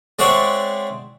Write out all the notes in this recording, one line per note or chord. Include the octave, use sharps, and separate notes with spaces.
G#3 C4 C#5 D5 E5 F#5